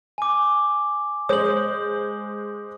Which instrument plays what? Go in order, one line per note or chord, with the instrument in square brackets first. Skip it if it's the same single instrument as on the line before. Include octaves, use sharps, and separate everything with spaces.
[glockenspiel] G#5 D6
[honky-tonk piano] G#3 C5 [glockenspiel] D#6 F#7